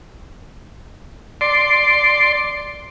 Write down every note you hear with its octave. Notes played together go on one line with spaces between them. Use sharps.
D5 C6